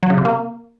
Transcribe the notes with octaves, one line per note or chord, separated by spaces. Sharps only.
F#3
C#3
C3
A#3